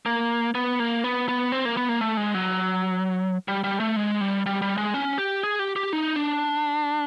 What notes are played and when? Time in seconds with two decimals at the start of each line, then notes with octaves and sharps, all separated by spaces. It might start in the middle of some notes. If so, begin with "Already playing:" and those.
0.06 A#3
0.55 B3
0.79 A#3
1.04 B3
1.29 B3
1.52 C4
1.65 A#3
1.77 B3
1.89 A#3
2.01 A3
2.17 G#3
2.34 F#3
3.48 G3
3.64 G3
3.80 A3
3.96 G#3
4.21 G3
4.46 G3
4.62 G3
4.77 G#3
4.94 C#4
5.18 G4
5.43 G#4
5.59 G4
5.76 G4
5.93 D#4
6.16 D4